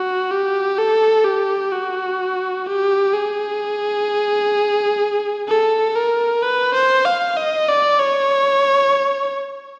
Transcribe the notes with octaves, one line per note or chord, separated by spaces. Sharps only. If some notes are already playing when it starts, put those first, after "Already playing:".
Already playing: F#4
G4
A4
G4
F#4
G4
G#4
A4
A#4
B4
C5
F5
D#5
D5
C#5